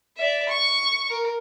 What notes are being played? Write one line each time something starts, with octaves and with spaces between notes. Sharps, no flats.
D5 E5
C#6
A#4